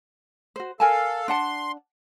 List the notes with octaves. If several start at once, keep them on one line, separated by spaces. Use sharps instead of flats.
F#4 C5
A4 A#4 F5 G#5 A5
D4 F#5 A5 C6